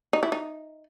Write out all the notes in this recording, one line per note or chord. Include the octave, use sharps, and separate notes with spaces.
D#4
E4
D#4